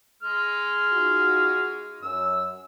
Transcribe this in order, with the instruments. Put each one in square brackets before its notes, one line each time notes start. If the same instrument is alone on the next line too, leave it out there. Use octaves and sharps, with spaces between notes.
[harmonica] G#3 F6
[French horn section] D#4 F4 F#4
[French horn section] F#2 [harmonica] E6